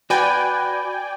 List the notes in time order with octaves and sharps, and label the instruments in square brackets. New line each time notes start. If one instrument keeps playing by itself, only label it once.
[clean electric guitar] F#4 B4 [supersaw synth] D5 G5 G#5